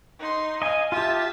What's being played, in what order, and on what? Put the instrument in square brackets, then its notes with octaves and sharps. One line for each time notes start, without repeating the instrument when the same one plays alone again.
[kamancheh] D#4 C6
[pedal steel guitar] D#5 G#5 [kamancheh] F5
[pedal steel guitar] F4 G4 [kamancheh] E5 A5